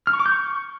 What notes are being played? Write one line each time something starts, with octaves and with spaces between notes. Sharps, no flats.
F6
C#6
D6
G6
C#6